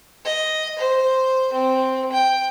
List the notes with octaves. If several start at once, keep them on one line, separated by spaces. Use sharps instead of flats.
D#5
C5
C4
G5